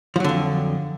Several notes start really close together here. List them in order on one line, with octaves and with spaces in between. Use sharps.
F3 F#3 D3 F2